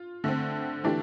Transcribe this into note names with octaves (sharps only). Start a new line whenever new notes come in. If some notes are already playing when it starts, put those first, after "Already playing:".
Already playing: F4
D3 A3 C4
E3 A3 D4 G4